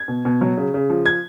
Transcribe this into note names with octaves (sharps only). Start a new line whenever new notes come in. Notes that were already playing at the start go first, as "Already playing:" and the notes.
Already playing: G#6
B2
B2
F#3
C#3
C#3
F3
G#6